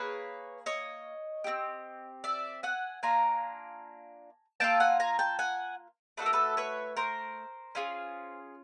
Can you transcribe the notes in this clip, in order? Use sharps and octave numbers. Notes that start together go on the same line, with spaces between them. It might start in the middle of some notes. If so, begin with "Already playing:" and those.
Already playing: A#3 G#4 B4 C#5
C#5 D#5
C4 E4 G4
D5 E5
F#5 G#5
A#3 D4 F4 G#5 A#5
A#3 D4 F4 A4 G5 A5
F#5 G#5
G#5 A#5
G5 A5
F#5 G#5
A3 D4 F#4 A4 B4
A#4
A4 B4
B4 C#5
A#4 C5
C#4 F4 G#4